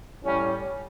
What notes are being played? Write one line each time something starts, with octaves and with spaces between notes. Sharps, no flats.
A2 G3 C#4